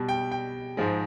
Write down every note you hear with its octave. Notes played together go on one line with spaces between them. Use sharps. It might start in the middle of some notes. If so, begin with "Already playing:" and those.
Already playing: B2 G3
G5
G5
G#2 F3 G#3